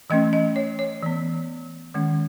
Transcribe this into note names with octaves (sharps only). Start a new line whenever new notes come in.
E3 A3 C#4 D#5
D#5
C#5
C#5
E3 B3
D#3 G#3 C#4